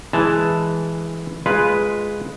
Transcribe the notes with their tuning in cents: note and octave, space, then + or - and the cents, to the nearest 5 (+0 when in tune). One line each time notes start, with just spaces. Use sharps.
E3 +0 G#3 +0 A5 +0
G#3 +0 F4 +0 B4 +0